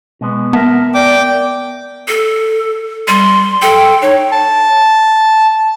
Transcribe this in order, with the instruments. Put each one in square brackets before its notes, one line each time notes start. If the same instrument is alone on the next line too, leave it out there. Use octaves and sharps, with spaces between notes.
[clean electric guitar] B2 G#3 B3
[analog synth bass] B3 [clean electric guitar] A#4 E5 A5
[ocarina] D5 [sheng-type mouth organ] G5 D6
[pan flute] A4
[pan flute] G3 [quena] C6
[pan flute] A4 [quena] G5
[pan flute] D#4 [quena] C#5
[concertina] A5